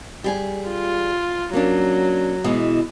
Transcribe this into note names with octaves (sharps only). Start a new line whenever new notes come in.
G3 G#4 G#5
F4
F#3 A#3 C#4 D4
B2 E3 G#3